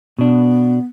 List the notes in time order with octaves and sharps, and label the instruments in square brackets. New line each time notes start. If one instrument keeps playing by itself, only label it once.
[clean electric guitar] B2 D4 [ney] B3